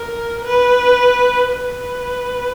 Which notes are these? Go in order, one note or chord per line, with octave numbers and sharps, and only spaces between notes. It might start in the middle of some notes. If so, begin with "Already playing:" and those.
Already playing: A#4
B4
B4